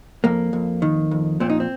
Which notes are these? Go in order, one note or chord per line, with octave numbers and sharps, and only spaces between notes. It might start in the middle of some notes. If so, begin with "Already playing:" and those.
F2 A#3
F2
D#3
F2
A#2 C4
D#4
C4